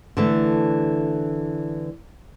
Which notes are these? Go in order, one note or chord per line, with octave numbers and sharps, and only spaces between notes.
D3 E3 A3